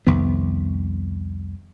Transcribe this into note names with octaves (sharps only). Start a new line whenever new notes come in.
C2 F2 D#3 B3